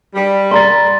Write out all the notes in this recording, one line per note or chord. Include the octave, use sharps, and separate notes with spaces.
G3
D5 A#5 C6 A6